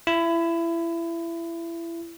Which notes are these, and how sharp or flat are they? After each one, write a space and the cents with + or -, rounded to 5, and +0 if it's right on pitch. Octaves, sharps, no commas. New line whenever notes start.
E4 +25